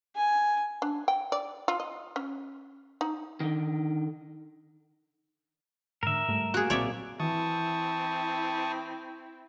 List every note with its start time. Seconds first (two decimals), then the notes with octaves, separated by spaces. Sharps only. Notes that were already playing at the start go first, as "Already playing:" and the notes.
0.16 G#5
0.82 D4
1.08 G5
1.32 D5
1.68 F4
1.80 D#5
2.16 C#4
3.01 D#4
3.40 D3 D#3
6.03 G#2 D3 A#4 E5
6.28 G#2 G3 A3
6.54 A#3 F#4 G#4
6.70 B1 A#2 C4 C#5 D5 E5
7.20 E3 C4 E4 A5 C#6 D#6